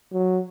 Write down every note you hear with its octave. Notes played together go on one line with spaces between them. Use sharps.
F#3